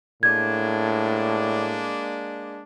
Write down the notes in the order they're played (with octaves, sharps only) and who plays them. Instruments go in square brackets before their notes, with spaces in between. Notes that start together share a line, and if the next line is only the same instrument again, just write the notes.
[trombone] A2 [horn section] G#3 A#3 D4 [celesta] G#6